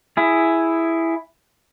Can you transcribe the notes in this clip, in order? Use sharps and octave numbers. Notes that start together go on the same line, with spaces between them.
E4 G#4